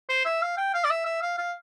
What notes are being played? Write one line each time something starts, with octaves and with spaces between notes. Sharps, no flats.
C5
E5
F5
G5
F5
D5
E5
E5
F5
F5